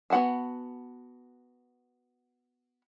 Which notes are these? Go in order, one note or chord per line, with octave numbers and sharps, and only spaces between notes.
B3 F#4 F#5 G#5 A5